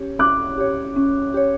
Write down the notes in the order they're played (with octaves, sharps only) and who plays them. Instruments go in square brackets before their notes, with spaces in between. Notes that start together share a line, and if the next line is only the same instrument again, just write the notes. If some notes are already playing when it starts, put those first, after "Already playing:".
Already playing: [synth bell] C#4 G4 C#5
[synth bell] C#4 [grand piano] D6 F#6
[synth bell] G4 C#5
C#4
G4 C#5